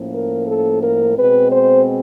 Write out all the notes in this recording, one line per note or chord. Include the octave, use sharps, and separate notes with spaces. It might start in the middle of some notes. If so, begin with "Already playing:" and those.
Already playing: A2 F3 A#3 C#4
A#4
A4
A#4
B2 G#3 C4 B4
C5